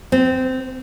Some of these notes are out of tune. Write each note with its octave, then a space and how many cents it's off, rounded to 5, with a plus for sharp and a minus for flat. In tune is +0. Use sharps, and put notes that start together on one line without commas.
C4 -20